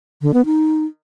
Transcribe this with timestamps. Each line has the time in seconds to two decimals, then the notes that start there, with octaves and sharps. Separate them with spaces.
0.22 D3
0.34 B3
0.46 D#4